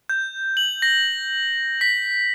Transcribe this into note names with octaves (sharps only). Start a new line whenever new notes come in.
G6
F#7
A#6
B6